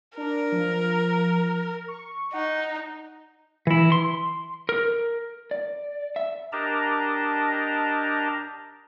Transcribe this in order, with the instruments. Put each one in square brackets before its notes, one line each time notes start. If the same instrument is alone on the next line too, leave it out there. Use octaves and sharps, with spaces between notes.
[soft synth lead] D4 [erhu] A#4
[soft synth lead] F3
C#6
[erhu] D#4 [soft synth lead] F#5
[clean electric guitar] E3 E4
C6
A#4
[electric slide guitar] D5
E5
[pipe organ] D4 G4 A#4 D#5 A5 A#5